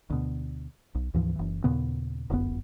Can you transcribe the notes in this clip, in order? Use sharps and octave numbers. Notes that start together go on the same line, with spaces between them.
D2 B2
B1
D2 G#2 E3 F3
F#1 E3
D#2 A#2 C#3 B3
D1 G1 F#2 B3